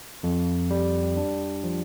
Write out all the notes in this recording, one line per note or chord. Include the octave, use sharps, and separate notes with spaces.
F2
G3
D4
F3